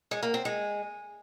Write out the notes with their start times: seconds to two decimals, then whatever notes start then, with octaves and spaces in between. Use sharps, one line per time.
0.11 G#3
0.23 A#3
0.34 C4
0.45 G#3